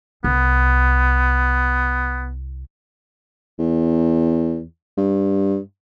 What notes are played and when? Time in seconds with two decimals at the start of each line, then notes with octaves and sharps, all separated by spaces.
0.24 C2 B3
3.59 E2
4.97 G2